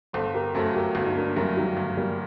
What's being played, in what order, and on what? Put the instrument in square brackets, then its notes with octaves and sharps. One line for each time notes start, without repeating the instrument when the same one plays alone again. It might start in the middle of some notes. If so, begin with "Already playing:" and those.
[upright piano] G1 [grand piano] A4 C5
[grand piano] G4 A#4
[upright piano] F#2 F#3 A3 [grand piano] A4 C5
[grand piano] G4 A#4
[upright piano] G1 [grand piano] F#4 A4
[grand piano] D#4
A#3 D4
[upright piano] F#2 F#3 A3 [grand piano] G3 A#3
[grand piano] D#3 G3
[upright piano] G1
[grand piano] G3 A#3